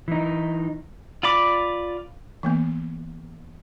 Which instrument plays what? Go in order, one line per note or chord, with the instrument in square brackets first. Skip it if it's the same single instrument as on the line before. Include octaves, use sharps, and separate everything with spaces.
[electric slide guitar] E3 D#4
[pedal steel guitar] F4 D5 B5 D6
[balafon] E3 A#3 B3